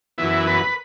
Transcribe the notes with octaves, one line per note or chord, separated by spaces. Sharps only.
F#2 E3 B3 E4
B4